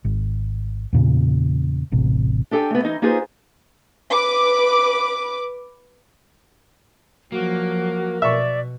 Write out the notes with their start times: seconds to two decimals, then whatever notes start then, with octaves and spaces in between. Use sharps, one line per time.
0.05 G#1
0.93 E2 A#2 C#3
1.92 E1 A1 C3
2.51 D4 G4 A4 G5 G#5
2.71 A3 B3
2.83 E3 D#4 D#5
3.02 A#3 D#4 F4 G#4 B4 C5
4.11 B4 D6
7.32 F3 F#3 A#3 F#4
8.22 B2 D5 E5 C#6